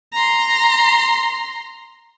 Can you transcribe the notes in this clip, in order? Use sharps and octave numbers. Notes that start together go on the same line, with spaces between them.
A#5 C6